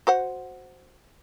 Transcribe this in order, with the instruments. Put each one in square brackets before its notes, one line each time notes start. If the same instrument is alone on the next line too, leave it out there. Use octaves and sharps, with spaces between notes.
[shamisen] F#4 C5 F#5